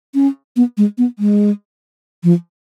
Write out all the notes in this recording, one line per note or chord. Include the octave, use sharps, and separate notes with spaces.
C#4
B3
G#3
B3
G#3
F3